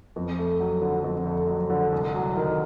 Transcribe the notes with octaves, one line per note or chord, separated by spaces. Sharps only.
F2
A3
F#3
D3
F2
A3
F#3
D3
C2
F#3
D#3